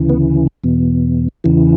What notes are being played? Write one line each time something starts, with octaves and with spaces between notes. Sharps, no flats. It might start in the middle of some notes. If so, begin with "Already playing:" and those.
Already playing: D2 C#3 E3
B3
E2 B2
E2 C#3 E3